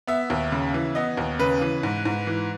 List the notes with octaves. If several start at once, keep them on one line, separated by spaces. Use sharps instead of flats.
B3 E5
D#2
C#3
E3
B3 D#5
D#2
C#3 B4
E3
G#2
G#2
E3